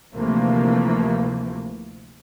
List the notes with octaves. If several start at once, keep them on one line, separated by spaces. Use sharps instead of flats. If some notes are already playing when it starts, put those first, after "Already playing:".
D2 C3 E3 F3 A3 A#3